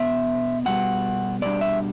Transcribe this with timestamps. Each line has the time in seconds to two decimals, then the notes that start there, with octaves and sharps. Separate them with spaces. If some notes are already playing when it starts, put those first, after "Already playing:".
Already playing: B2 B3 E5
0.66 B2 G3 B3 F#5
1.42 B2 G3 D4 D5
1.61 E5